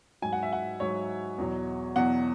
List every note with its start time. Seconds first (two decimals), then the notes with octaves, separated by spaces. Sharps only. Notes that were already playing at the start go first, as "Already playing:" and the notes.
0.22 G#2 F#3 G#5
0.33 F#5
0.43 E5
0.53 F#5
0.80 G#2 F#3 C#5
1.38 E2 B2 F#3
1.96 E2 B2 F#3 F#5